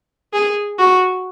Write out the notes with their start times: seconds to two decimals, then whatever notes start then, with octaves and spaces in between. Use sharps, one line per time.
0.33 G#4
0.78 F#4